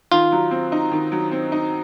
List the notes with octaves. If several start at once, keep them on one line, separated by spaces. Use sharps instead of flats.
D#3 F4
F#3
C4
D#4
D#3
F#3
C4
D#4